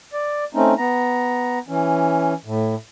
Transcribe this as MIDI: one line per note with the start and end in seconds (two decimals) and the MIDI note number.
0.13 0.44 74
0.54 0.74 57
0.54 0.74 60
0.54 0.74 61
0.54 0.74 63
0.78 1.59 59
0.78 1.59 82
1.68 2.33 52
1.68 2.33 61
2.45 2.75 45